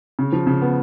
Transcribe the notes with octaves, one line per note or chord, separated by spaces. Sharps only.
C#3
F3
C#3
B3